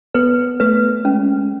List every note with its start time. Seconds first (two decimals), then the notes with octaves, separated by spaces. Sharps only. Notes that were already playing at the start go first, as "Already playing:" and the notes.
0.14 B3 B4
0.60 A3 B4
1.05 G#3 C#4